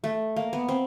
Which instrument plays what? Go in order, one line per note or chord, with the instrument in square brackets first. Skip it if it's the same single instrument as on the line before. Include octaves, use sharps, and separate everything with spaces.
[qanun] A3
A#3
B3
C4